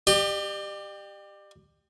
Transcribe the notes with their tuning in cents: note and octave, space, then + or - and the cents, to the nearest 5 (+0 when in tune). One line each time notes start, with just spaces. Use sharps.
G4 +10 D5 +45